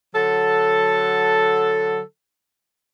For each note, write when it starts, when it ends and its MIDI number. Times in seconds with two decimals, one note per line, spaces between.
0.14 2.00 50
0.14 2.00 54
0.14 2.00 69